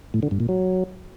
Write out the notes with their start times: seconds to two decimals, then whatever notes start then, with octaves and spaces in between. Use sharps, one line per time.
0.14 A2
0.23 D3
0.31 G2
0.40 A#2
0.49 F#3